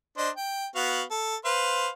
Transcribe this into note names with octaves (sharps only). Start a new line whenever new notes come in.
D4 C5 D#5
G5
B3 F#4 F5
A4
B4 C5 F5